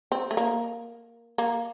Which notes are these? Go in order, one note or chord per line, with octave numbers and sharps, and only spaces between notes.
C4
A3
A#3
A#3